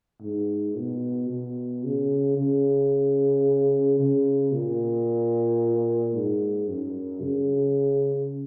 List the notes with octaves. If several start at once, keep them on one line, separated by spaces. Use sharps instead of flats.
G#2
B2
B2
C#3
C#3
C#3
A#2
G#2
F#2
C#3